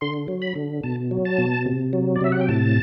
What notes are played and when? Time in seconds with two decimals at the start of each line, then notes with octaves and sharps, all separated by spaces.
0.01 D3 C6
0.28 F#3
0.42 B5
0.55 D3
0.83 B2 A5
1.11 F#3
1.25 A5
1.38 B2
1.66 C3
1.93 F#3
2.16 D5
2.21 C3 E5
2.32 F#5
2.41 G5
2.48 A2 A5